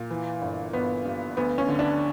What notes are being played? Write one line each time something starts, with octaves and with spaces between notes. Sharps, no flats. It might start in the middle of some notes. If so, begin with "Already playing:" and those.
Already playing: A#2
E3
G1
G1 B3
G2
D2 B3
C#4
D3
D4